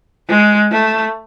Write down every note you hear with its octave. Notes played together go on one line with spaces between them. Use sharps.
G#3
A3